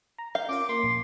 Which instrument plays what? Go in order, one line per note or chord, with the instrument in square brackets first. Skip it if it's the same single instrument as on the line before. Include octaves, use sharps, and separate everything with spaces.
[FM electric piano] A#5
[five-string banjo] F5 [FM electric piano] G6
[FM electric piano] C#4 F4 A#4 [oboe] D6
[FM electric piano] A#3 [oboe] C6
[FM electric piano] A#1